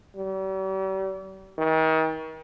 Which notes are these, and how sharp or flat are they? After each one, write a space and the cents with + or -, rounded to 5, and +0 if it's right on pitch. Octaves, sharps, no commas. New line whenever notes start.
G3 -40
D#3 +40